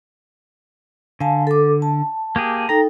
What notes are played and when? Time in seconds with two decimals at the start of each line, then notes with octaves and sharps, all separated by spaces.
1.20 D3 F5 G#5 A5
1.47 A4 D6
1.82 A5
2.36 A#3 G4 G#4
2.69 D#4 A4 G5 A#5